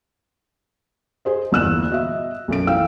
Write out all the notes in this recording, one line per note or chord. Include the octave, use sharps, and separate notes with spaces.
G#4 C5 D#5
G1 E2 A#2 E6 F#6 E7
F#4 D#5 E5
B1 F#2 A4 D7
E3 F5 G5 E6